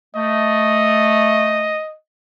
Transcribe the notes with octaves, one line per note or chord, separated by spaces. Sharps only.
A3 D#5